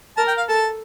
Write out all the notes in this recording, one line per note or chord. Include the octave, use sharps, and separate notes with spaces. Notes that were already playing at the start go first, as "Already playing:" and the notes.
A#4 A5
G5
F5
A4 A5